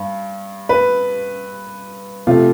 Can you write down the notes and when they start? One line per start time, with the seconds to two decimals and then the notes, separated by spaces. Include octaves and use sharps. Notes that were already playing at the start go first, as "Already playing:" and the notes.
Already playing: G2
0.69 B4
2.27 C3 F3 A3 F4